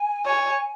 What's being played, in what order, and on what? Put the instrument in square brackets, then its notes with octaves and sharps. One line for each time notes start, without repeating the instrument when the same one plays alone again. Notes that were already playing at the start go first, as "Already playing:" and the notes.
Already playing: [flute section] G#5
[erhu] C#5